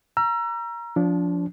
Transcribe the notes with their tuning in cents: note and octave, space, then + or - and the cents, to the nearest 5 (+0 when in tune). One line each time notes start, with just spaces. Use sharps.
A#5 +15 E6 +40
F3 +10 D4 -25